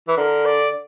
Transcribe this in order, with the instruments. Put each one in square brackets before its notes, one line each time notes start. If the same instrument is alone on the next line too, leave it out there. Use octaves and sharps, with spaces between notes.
[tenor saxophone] E3
[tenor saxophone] D3 [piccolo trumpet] A#4
[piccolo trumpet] D5